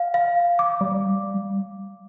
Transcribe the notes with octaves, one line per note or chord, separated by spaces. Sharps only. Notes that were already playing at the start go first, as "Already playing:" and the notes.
Already playing: F5
F5
D6
G3